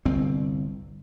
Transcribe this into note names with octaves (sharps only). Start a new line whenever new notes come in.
G1 C2 C4